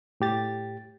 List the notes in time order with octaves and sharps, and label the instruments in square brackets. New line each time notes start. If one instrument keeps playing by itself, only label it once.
[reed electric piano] A2 G4 A6